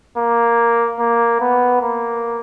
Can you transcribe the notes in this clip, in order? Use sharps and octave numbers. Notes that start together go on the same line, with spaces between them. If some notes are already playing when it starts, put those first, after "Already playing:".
A#3
A#3
B3
A#3